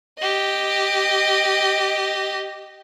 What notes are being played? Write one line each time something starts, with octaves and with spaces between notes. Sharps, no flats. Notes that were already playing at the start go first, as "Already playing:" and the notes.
G4 D#5